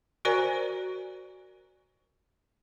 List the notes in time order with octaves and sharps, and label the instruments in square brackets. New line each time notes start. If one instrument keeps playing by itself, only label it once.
[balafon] F#4 A#4 C5 D5 G#5 A#5